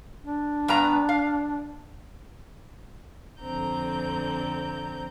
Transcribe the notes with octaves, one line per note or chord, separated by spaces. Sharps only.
D4
G2 B3 A#5
F5
F2 D3 C4 A#5 G6